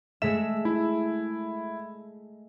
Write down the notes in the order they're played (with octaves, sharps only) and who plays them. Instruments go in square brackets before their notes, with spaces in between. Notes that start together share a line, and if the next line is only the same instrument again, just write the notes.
[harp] G#3 A3 E5 [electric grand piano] E7
[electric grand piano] E4